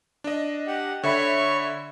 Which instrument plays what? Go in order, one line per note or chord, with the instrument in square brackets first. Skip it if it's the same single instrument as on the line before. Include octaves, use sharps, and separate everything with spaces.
[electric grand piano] D4 D#5
[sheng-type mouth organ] G4 F#5
[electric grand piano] D3 E5 B5 [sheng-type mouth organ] C#5 C#6